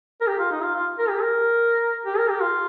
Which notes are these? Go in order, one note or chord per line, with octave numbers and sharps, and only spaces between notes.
A#4
G4
F4
D#4
F4
F4
A#4
G4
A#4
G4
A#4
G4
F4